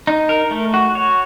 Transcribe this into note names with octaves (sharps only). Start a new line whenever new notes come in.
D#4
A#4
A3
F#4
C#5